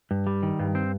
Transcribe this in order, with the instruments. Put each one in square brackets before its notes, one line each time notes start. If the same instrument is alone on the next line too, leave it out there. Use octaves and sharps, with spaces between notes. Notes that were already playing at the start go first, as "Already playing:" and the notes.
[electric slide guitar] G2
G3
D#3
G2
C4